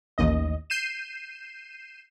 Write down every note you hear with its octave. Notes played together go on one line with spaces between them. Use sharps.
A1 D#2 D#5
G6 C7 D#7 E7